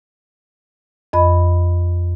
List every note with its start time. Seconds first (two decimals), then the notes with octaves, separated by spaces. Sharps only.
1.13 F2 D#5 B5